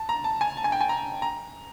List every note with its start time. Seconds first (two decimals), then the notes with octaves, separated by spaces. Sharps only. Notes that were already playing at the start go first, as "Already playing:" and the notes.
Already playing: A5
0.09 A#5
0.24 A5
0.41 G#5
0.57 A5
0.64 G#5
0.72 G5
0.81 G#5
0.89 A#5
1.22 A#5